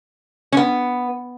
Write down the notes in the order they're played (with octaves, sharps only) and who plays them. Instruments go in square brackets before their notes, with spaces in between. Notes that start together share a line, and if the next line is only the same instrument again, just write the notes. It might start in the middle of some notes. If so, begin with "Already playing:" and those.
[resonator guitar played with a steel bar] C#4
B3